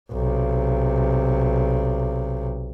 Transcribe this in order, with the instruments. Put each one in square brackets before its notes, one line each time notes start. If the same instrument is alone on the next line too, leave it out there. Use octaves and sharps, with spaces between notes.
[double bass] B1 C3